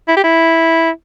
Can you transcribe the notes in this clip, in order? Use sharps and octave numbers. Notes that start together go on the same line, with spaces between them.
E4
G4
E4